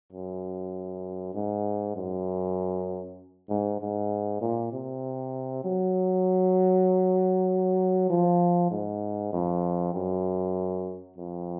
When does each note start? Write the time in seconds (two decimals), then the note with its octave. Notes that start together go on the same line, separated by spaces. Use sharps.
0.12 F#2
1.34 G#2
1.96 F#2
3.49 G#2
3.81 G#2
4.41 A#2
4.72 C3
5.64 F#3
8.10 F3
8.71 G#2
9.33 F2
9.94 F#2
11.17 F2